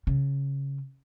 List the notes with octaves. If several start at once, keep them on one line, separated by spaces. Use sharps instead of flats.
C#3